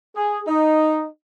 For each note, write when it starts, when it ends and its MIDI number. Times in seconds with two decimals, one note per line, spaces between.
0.15 0.41 68
0.47 1.06 63